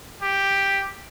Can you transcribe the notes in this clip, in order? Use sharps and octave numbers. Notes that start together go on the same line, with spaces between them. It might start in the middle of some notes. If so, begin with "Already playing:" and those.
G4